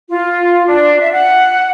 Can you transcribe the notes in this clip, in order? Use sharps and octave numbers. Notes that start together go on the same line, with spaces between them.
F4
D4
E5
F#5